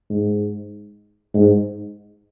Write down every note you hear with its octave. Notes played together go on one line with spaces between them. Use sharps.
G#2
G#2